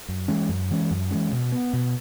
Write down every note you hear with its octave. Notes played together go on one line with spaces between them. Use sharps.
F#2
E3 G#3 C#4
F#2
E3 G#3 C#4
F#2
E3 G#3 C#4
B2
B3
B2